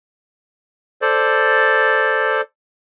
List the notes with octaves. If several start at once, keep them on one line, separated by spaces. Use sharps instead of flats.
A4 C5 D5